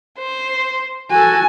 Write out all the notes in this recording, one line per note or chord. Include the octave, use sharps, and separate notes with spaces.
C5
F#4 A4 G#5